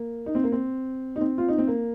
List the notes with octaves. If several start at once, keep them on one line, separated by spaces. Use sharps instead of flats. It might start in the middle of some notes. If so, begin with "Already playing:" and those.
Already playing: A#3
D#4
C4
A#3
C4
D#4
C4
F4
D#4
C4
A#3